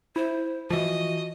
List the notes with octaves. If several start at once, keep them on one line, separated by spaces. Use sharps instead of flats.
E4 C5
E3 F3 F#4 D#5